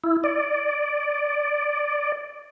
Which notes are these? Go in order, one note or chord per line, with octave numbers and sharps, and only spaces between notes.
E4
D5